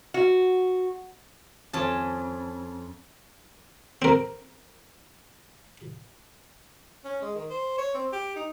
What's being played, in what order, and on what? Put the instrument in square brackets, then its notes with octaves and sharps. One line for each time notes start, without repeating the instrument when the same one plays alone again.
[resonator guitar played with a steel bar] F#4
[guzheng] F2 C#4 A5
[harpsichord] C4 A#4
[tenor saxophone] C#4
G#3
D#3
C5
C#5
C4
G4
D#4